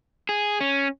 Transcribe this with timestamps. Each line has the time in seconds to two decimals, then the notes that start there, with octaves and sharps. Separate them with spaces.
0.29 G#4
0.60 C#4